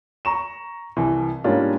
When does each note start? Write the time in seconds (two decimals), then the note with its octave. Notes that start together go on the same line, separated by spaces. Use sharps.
0.25 A#5 C#6 E7
0.97 C2 E3
1.44 G#2 G3 A#3 C#4 D4 F4